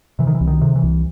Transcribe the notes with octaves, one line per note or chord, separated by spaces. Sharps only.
C3 E3
D#3
E3
C2
D#3
C3
E3
C2